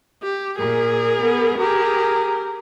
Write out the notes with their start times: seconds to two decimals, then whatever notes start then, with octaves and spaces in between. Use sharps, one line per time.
0.23 G4
0.58 A#2 G#4 A#4
1.23 B3
1.59 G4 G#4 A#4